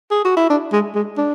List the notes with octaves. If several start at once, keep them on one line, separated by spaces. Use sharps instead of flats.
G#4
F#4
E4
D4
G#3
G#3
D4